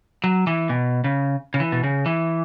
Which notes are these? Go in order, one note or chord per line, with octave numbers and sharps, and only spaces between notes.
F#3
E3
B2
C#3
C#3
E3
B2
C#3
E3